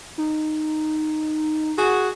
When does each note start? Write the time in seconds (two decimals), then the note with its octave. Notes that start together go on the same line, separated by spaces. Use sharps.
0.18 D#4
1.77 F#4 G#4